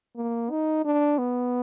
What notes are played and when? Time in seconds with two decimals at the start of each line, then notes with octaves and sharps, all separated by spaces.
0.16 A#3
0.50 D#4
0.85 D4
1.18 B3